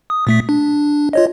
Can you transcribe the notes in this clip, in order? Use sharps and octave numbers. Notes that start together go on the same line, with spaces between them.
D#6
A#2 A3 B6
D4
F4 C#5 D#5